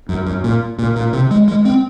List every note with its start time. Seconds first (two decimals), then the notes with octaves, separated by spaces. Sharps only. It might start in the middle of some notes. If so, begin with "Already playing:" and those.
0.09 F#2
0.26 F#2
0.44 A#2
0.79 A#2
0.96 A#2
1.13 C3
1.31 G#3
1.48 G#3
1.65 C4